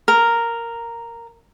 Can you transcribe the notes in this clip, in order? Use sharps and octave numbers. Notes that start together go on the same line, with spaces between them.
A#4